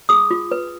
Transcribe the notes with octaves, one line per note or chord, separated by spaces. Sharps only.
G#4 D#6
F4
B4